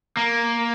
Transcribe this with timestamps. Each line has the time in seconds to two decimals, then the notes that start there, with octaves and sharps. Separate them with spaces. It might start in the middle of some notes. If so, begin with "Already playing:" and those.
0.17 A#3